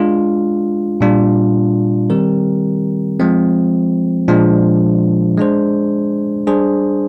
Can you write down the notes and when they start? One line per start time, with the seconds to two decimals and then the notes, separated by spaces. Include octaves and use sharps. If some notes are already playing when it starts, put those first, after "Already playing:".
Already playing: G#3 D4 F4
1.01 A#2 G3 D4 F4
2.10 D#3 G3 C4 G4 A#4
3.20 F3 G#3 C4
4.28 A#2 F3 G#3 D4
5.37 G#3 D4 G#4 C5
6.47 G3 D4 G#4 C5